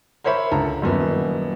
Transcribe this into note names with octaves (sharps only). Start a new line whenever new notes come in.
A#4 C5 C#5 E5 B5
C#2 D3 A5 A#5
D#1 F#2 B3